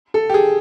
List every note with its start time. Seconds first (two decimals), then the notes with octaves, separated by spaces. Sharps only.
0.14 A4
0.29 G4
0.34 G#4